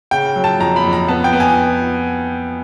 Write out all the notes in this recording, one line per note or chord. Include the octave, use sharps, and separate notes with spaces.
C#3 G5
F#3
A5
F2 A#5
B5
F2
A#5
B3 A5
G5
B3
G#5